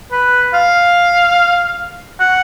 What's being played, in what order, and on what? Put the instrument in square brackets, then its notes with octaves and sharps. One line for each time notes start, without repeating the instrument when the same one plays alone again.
[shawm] B4
F5
F#5